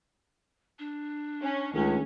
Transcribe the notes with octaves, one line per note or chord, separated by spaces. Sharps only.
D4
C#4
C#2 D#3 A3 C#4 G#4